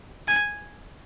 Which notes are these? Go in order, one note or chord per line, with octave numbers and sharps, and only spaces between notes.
G#5